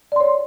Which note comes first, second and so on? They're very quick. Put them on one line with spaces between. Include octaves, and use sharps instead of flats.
D5 C6 C#5